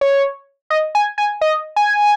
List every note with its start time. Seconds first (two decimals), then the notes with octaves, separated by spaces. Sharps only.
0.01 C#5
0.70 D#5
0.95 G#5
1.18 G#5
1.41 D#5
1.76 G#5